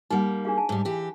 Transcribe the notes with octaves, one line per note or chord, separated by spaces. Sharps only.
G3 A#3 D#4 F#5
D4 G#4 F5
G#5 A5
G#2 G3
E3 G4